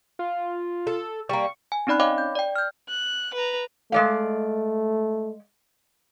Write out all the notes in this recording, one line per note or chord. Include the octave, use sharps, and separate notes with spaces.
F4
A4
G3 A#3 C#6
G#5
C4 C#4 D#4 D5 B5 F#6
C#5 D#5 F5 G5 B5 D6
G6
D5 G5
F6 G6
F#6
B4 A#5
G#3 A3 D5 F5